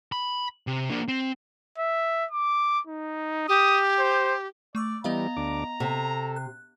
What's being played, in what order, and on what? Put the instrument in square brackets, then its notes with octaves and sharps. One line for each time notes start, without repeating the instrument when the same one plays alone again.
[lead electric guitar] B5
C3
A#3 D4
C4
[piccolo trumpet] E5
D6
D#4
[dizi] G4 [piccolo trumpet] D#6
[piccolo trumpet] C5
[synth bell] A3 C#6 E6 [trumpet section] D5
[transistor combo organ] E3 G3 [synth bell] B3 D#5 F5 [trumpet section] A#5
[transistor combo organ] D2 D4 D6
[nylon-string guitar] C3 [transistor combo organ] A4
[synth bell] F#6